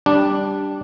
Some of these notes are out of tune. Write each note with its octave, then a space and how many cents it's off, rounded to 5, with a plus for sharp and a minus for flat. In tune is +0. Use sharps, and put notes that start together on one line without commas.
G3 +0 D4 +0